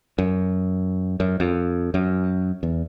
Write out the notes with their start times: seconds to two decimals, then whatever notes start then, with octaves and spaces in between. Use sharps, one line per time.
0.18 F#2
1.20 F#2
1.40 F2
1.94 F#2
2.63 E2